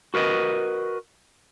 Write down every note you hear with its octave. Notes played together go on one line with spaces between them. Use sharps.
F#4 A#4 B4 D#5